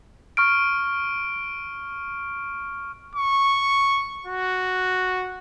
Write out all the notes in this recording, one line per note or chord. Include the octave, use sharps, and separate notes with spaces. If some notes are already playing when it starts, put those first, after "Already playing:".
C#6 F6 D7
C#6
F#4